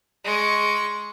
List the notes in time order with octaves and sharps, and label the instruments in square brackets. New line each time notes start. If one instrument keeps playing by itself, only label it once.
[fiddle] G#3 C#6